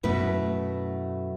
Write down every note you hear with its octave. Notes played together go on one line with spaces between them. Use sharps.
F#2 B2 A3 E4 B4